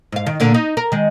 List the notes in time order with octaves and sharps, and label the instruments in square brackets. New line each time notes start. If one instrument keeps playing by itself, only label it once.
[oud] G#2 F5
D#3
A#2 D3 A#3
D#4
A#4
D#3 G#3